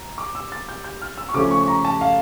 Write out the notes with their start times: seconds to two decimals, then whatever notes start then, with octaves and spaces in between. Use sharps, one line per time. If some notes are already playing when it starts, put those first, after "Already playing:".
Already playing: A#5
0.18 D6
0.35 E6
0.52 A6
0.69 G6
0.84 G6
1.02 F6
1.18 E6
1.29 C#6
1.34 C#3 F3 A3 C#4 D6
1.51 C#6
1.63 C#6
1.68 A#5
1.85 A5
2.01 F5